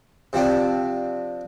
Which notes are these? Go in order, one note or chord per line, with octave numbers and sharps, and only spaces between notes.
C3 F3 C4 D4